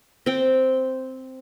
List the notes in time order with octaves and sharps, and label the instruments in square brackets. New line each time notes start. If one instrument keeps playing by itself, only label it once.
[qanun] C4 G5